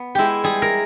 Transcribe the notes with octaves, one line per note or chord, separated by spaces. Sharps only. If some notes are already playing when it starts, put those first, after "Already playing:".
Already playing: B3
G#3 E4 G4
G3 G#4
A#4